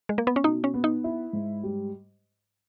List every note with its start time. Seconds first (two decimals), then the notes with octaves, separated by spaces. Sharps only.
0.09 G#3
0.18 A#3
0.27 B3
0.36 C#4
0.44 B2 D#4
0.64 C#4
0.74 B3
0.84 D#4
1.04 E4
1.33 G#2
1.63 G3